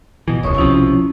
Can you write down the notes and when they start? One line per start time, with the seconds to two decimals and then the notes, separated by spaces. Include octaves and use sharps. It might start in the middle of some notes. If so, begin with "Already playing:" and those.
0.28 B2 E3
0.43 D#1 C#2 C#5 C#6 D#6
0.56 B1 C3 F3 C#4 E4